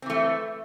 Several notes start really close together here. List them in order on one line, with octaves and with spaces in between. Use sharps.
C4 E3 A3